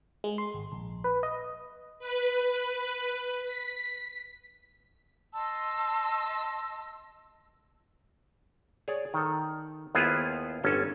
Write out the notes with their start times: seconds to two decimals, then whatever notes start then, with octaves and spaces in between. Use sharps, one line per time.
0.24 G#3
0.38 C6
0.54 G#1
0.72 A#1
1.04 B4
1.23 D#5
1.99 B4
3.45 B6
5.33 D#5 A5 C6 E6
8.88 G#4 C#5 D5
9.14 D#3 A4
9.95 D#2 B3 E4 F4 G#4 C5
10.64 G1 C#4 A4